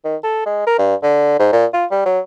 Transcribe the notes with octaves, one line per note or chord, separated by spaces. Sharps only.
D#3
A4
G#3
A#4
G2
D3
G#2
A#2
F4
G3
F#3